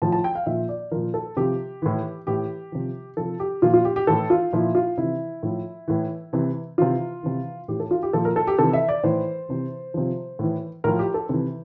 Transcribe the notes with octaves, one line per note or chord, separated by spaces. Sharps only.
A2 F3 A5
A5
G5
F5
A#2 F3 E5
D5
A#2 F3 A#4
A4
C3 F3 G4
A2 E3
A2 E3 G4
C3 F3
C3 F3 A4
G4
A#2 F3 F4
F4
G4
G4
A2 E3 A4
F4
A#2 F3 E4
F4
C3 E3 E4
A2 F3
A2 E3
C3 E3
C3 E3 F4
C3 E3
A2 E3 G4
A4
F4
G4
A#2 F3 A4
A#4
A4
G4
C3 E3 A4
E5
D5
A2 E3 C5
C3 E3
C3 F3
A2 E3
A2 F3 A#4
G4
A4
C3 E3